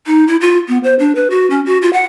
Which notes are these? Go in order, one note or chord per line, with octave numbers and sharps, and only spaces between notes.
D#4
E4
F4
B3
C5
D4
B4
F#4
C#4
F#4
F4
F#5